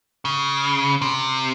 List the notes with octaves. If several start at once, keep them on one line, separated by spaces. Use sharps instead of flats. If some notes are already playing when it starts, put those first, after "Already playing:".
C#3
C3